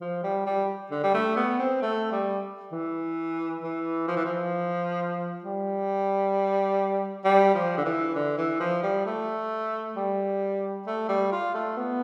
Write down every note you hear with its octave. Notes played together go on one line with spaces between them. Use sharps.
F3
G3
G3
D3
G3
A3
B3
C4
A3
G3
E3
E3
F3
E3
F3
G3
G3
F3
D3
E3
D3
E3
F3
G3
A3
G3
A3
G3
F4
A3
B3